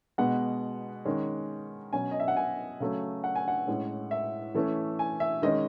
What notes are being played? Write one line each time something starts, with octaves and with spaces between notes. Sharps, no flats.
B2 G#3 B3 F#5
D#3 G#3 C#4
B2 F#3 C#4 G#5
D#5
E5
F#5
G#5
C#3 F#3 A3 C#4
F#5
G#5
F#5
A2 G#3 C#4
E5
E3 A3 C#4
G#5
E5
D#3 G#3 C#4 D#5